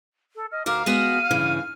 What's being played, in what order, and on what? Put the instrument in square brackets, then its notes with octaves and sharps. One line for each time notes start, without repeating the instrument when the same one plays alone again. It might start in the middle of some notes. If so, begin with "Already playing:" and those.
[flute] A4
[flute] D#5 [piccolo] F6
[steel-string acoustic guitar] D2 F#4 A#4 [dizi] F5 [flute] D6 [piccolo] F6
[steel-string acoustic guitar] G#3 B3 F#4 [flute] F6 [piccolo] D#7
[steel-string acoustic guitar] G2 C#3 E3